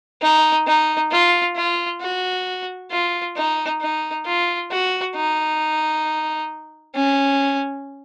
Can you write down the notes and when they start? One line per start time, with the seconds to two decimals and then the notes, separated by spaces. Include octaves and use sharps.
0.22 D#4
0.67 D#4
1.12 F4
1.56 F4
2.01 F#4
2.91 F4
3.36 D#4
3.81 D#4
4.26 F4
4.71 F#4
5.15 D#4
6.95 C#4